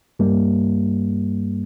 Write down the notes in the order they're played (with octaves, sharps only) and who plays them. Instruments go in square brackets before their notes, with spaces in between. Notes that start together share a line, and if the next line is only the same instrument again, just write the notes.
[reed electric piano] G2 G3 A#3